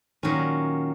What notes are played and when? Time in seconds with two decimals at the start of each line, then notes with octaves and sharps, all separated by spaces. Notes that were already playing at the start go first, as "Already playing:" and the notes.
0.23 A#2 D#3 F#3 C#4